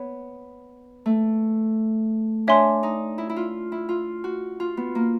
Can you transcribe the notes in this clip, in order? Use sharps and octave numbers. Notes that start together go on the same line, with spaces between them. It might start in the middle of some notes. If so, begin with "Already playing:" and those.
Already playing: B3 C#5
A3
D4 C#5 E5 G#5 C6
D#4
E4
E4
F4
E4
F4
F#4
F4
B3
A#3